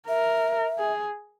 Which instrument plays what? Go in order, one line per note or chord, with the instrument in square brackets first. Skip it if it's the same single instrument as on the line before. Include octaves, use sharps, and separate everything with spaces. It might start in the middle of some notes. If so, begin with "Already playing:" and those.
[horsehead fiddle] A#4 [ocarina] E5
[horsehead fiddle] G#4